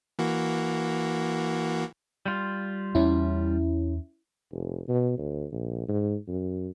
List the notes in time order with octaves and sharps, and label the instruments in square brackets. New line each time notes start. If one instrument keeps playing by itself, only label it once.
[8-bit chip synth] E3 A#3 F#4
[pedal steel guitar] G3 F4
[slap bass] E2 [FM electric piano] C#4 E4
[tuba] F1
B2
D2
A#1
G#2
F#2